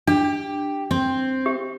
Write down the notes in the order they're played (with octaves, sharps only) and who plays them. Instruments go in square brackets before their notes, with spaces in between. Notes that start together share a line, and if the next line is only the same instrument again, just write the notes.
[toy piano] D4 [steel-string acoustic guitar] G4
[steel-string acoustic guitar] C4
[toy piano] G4